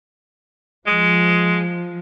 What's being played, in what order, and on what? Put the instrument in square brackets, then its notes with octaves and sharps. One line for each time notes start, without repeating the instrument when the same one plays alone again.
[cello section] F3 [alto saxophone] G#3